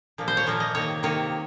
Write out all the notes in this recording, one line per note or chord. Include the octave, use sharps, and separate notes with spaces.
A#2 F3 A#3
C5
C#5
A#2 F3 A#3
D#5
C3 D#3 A#3 C#5
C3 D#3 A#3 C#5